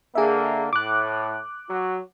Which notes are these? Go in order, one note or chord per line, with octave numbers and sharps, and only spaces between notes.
D3 A#3 G#4 E5
A2 D6 F#6
F#3 F#4